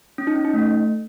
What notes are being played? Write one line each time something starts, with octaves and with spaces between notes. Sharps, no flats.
C#4
D#4
C#4
D#4
A3